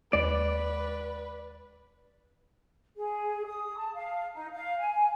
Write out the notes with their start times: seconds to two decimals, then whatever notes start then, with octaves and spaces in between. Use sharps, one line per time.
0.13 D#2 G#3 B4 D5
2.96 G#4
3.46 D#6
3.77 A5
3.94 F5
4.35 D#4
4.53 F5
4.79 G#5